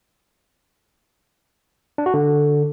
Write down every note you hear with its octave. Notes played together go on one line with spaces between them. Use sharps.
D4
F#4
D3